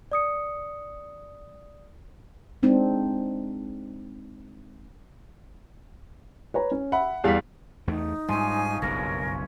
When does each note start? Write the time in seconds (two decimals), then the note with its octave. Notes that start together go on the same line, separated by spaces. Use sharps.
0.12 D5 D#6 C#7
2.63 G#3 C4 D4 D#4
6.54 B4 C#5 A#5
6.71 C#4
6.92 E5 F#5 B5
7.24 E2 G3 G#4 F5 B6
7.87 E2 A3 D#4
8.29 G#2 F3 G3 C#4 G#5
8.82 F#1 B1 G2 C#4 A#4